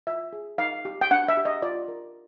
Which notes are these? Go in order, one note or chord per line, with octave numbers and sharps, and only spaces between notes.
F4 E5
G#4
D#4 F5
G4
G5
D4 F#5
E5
G4
D#5
F4 D5
A#4